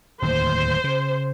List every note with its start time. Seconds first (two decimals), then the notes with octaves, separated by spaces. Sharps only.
0.22 D1 D#2 C5
0.84 C#3